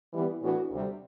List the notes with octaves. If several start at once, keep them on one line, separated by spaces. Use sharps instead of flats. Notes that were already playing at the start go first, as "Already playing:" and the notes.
E3 G3 B3
A2 E3 B3 D4 F#4
D2 C3 G3